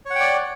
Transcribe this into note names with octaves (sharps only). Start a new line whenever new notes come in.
C#5 D5 F#5 G5